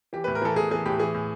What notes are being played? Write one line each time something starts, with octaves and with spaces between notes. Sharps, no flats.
E3 G4
A2 B4
A#4
E3 A4
A2 G#4
E3 G#4
A2 G4
E3 G#4
A2